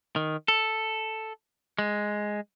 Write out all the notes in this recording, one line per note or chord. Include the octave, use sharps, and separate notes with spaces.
D#3
A4
G#3